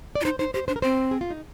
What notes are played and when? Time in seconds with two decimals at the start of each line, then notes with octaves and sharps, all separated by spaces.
0.15 D5
0.21 F4
0.25 D#4 C5
0.39 D#4 C5
0.54 G4 C5
0.68 D4 C5
0.76 A#4
0.82 C4 C5
1.11 G#4
1.21 F4
1.31 D#4